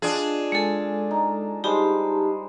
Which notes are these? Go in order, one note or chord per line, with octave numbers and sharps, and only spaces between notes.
D4 F4 G#4 D5 D#5
G#3 A4 G#5 A5
D#4
G3 G#3 D#4 G4 C5 A5